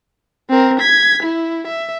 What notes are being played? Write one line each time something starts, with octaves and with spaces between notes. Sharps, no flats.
C4 A#4
G#6 B6
E4
E5